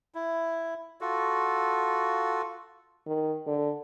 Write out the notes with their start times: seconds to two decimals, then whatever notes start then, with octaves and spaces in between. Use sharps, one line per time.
0.15 E4
1.01 F4 F#4 A4
3.07 D#3
3.47 D3